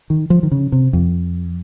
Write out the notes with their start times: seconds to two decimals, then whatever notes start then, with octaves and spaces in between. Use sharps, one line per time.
0.10 D#3
0.30 F3
0.43 D#3
0.51 C#3
0.72 C3
0.93 F2